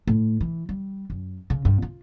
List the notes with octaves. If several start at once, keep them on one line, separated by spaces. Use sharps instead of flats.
A2
E3
G3
F#2
C#3
G2
F4